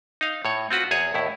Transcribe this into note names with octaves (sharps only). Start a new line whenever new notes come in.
D#4 F5
A2 C#5
C4 F4 F#4 B4
E2 G#4 C#5 G#5
D#2 A2 E4